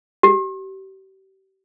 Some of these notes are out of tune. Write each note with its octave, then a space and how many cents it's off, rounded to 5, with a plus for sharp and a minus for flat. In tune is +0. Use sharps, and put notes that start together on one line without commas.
G4 -35